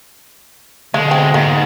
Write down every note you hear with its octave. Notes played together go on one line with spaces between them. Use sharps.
B2 D3 G#3 F5
C4
G#2 A#3